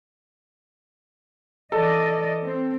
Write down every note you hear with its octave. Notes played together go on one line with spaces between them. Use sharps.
E3 A4 D5 D#5
C4